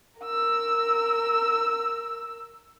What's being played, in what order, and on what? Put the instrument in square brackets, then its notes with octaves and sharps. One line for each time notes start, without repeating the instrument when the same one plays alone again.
[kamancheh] A#4 E6